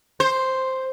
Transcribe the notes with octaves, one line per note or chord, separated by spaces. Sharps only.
C5